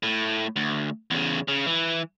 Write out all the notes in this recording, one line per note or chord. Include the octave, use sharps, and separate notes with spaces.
A2
D2
E2 C#3
C#3
E3